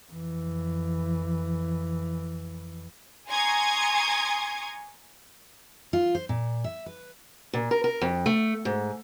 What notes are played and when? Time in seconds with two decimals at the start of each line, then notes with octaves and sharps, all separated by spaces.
0.11 F2 E3
3.29 G#5 A#5 C6 C#6 D#6 G#6
5.93 F4
6.15 C5
6.29 A#2
6.64 E5
6.86 B4
7.53 A#2
7.71 A#4
7.84 A#4
8.01 F2
8.26 A3
8.65 G#2